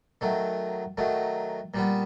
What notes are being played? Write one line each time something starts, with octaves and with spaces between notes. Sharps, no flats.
D#3 F#3 A3
D#3 F#3 A3
A#2 G3 B3